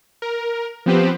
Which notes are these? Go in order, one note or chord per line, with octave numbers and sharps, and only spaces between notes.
A#4
F3 B3 C4 G4 B4 C5